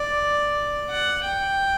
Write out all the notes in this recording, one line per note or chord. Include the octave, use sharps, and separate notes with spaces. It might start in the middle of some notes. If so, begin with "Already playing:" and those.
Already playing: D5
F#5
G5